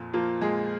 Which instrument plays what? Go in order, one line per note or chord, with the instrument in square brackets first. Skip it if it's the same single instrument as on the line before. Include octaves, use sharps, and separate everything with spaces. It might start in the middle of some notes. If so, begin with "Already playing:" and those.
Already playing: [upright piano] F2 A#2
F3 A#3 F4
A#2 G#3 G#4